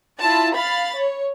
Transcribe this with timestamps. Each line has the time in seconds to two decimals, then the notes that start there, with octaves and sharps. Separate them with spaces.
0.19 E4 F4 A5
0.55 F5 B5 A6
0.96 C#5